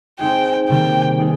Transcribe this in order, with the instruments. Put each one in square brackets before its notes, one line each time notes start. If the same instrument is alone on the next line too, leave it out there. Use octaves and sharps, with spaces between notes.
[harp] G#3 C4 D#4 G#4 [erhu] G5
[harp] C3 D#3 G3 A#3 [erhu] G5
[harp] G3 B3 D#4 G#4